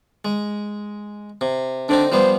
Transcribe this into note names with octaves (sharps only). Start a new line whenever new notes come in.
G#3
C3
D3 C4 D4 D#4
F3 G3 B3 C5